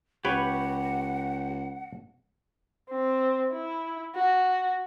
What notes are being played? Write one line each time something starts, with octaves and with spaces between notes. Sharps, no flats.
C#2 G4 B4 C#5 F#5 G5 B5 C#6
C4
E4
F#4